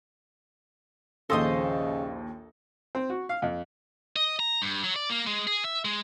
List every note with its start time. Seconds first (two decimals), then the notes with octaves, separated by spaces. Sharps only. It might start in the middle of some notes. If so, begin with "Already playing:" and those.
1.30 A#1 D#2 C#3 A4 C5 D#5 D#6 A#6
2.95 C4
3.10 F#4
3.29 F5
3.42 F2
4.16 D#5
4.39 A#5
4.62 G2
4.84 F#3
4.96 D5
5.10 A#3
5.27 G#3
5.47 G#4
5.64 E5
5.85 G#3